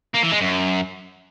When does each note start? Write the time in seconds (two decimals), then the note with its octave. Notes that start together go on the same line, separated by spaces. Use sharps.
0.14 A#3
0.23 E3
0.32 G#3
0.40 F#2